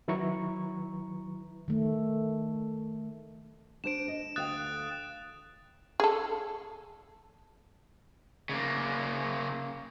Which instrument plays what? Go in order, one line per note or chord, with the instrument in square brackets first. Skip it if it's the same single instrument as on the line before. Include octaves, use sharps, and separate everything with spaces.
[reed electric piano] D#3 F#3 E4 B4 A#5 C#6
[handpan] D#3 A3
[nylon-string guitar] D4 C5 [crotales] D7 E7
[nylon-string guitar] D#5
[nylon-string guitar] D2 F5 G5 [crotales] D#6 F#6 A6
[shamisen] G#4 A4
[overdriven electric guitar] C#3 A#3